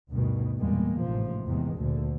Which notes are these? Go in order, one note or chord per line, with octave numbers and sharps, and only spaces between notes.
D2 G2 B2 D#3
E2 A#2 G3 G#3 A#3
A1 G#2 C3 F3
E2 C3 D#3 G#3
D2 A#2 D3